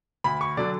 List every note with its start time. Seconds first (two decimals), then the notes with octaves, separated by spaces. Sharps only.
0.24 D2 B5
0.41 C#6
0.57 D3 F#3 D5